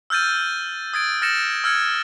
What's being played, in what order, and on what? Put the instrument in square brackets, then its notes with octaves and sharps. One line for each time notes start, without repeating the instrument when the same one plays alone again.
[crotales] E6 F6 G6 A6 D#7
D#6 G#6 A6 D7
F6 A6 A#6 C#7 E7
E6 F6 G#6 C#7